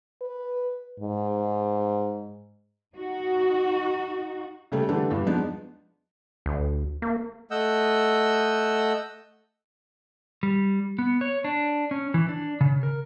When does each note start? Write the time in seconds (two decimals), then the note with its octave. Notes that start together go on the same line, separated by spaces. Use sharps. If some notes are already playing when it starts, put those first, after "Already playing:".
0.21 B4
1.00 G#2
2.94 D#4 F#4
4.72 C#3 G3 A3
4.88 D3 E3 G3 A3 D4
5.10 E2 G2
5.26 F3 G#3 B3 D4 D#4
6.46 D2
7.02 A#3
7.51 A3 D#5 F#5 E6 G6
10.43 G3
10.99 B3
11.21 C#5
11.44 D4
11.91 C#4
12.14 E3
12.29 D4
12.61 C#3
12.83 A#4